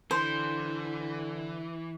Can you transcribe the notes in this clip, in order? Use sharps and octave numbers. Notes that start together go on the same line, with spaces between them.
D3 E3 C5